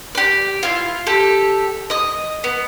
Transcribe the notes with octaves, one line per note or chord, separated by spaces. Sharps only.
G4 D5
E4 F4
G4 A4
D#5 D#6
B3